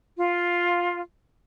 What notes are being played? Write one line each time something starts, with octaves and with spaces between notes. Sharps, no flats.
F4